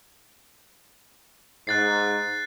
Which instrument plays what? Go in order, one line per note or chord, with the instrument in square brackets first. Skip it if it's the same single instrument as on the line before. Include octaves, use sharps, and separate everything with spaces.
[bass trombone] G#2 [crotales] F#6 A6 C7